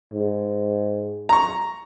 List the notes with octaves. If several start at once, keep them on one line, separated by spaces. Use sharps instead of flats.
G#2
A#5 C#6